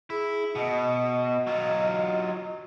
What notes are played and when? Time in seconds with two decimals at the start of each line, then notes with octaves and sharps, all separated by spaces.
0.10 E4 G#4
0.55 B2 D#5
1.47 F#3 F4